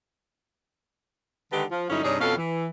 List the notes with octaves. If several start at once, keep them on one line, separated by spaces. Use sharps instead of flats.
D3 D#3 G#3 D#4 G4 B4
F3
G2 D3 F#3 C#4 D#4 E4
G2 C3 D#4 G#4 C#5 D5
F2 B2 B3 C#4 A4 F5
E3